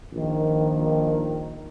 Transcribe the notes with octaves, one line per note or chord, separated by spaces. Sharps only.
A#1 D#3